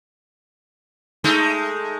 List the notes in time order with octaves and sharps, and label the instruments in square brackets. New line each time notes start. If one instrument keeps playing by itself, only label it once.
[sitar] G#3 A3 D#4